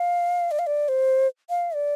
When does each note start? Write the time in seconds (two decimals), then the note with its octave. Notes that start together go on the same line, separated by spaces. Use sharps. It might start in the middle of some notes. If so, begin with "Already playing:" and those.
Already playing: F5
0.51 D5
0.59 F5
0.67 D5
0.88 C5
1.50 F5
1.75 D5